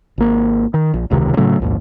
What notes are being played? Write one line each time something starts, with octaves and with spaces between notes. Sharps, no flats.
G#1 A#3
D#3
A#1
E1 C#2 C3 D#3
A2 C#3 F#3 A3
A#1 D#2 G#2